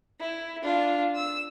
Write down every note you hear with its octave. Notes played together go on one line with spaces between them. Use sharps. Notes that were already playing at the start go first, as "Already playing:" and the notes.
E4
D4 F4
E6